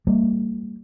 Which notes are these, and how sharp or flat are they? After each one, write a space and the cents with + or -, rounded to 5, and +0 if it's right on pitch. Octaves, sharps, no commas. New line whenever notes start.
G3 +0 A#3 -35